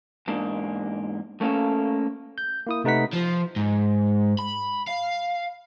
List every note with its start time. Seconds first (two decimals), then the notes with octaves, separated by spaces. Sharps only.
0.28 E2 G#2 A#3 D4
1.41 A3 A#3 C#4 A4 F5
2.38 G6
2.67 A#3 E4 D#6
2.84 C3 A3 D#4 B4 F#5 B6
3.13 F3
3.56 G#2
4.39 B5
4.87 F5